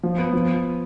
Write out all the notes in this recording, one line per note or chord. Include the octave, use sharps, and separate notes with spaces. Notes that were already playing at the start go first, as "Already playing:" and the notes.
F3
B3
F3